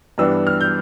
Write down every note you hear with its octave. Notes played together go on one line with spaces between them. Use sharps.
G2 E3 G3 B3 D4 E6
F6
G6